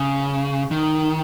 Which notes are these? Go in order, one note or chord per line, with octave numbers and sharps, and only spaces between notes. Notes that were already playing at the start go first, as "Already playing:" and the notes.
Already playing: C#3
D#3